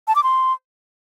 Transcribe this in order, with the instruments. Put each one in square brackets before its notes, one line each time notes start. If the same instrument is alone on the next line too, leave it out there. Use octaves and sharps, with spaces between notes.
[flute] A5
D6
C6